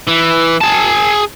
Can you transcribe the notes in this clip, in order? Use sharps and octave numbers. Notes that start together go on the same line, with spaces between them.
E3
G#4 A5